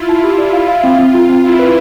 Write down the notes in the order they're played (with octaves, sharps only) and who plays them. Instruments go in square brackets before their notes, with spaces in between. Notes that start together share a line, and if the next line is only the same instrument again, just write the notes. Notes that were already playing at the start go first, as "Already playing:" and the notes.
Already playing: [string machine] E4 F4
[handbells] A5
[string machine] F4 [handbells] G4
[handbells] D5
F5
F5
C4
C4
F4
C4
[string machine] E4 [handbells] F4
[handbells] B4